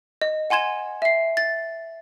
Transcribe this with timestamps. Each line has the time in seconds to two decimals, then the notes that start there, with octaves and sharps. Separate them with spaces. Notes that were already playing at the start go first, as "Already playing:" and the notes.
0.21 D#5
0.50 F#5 G#5 C6 G#6 E7
1.02 E5 C7
1.37 A6